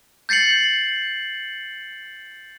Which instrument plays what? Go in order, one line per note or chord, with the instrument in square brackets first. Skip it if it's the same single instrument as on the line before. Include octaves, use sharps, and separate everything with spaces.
[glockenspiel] G6 A6 C7 C#7 F#7